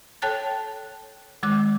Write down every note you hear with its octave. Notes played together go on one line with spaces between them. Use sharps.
A4 C#5 G5 A5 F#6 A6
D#3 G#3 D6 F#6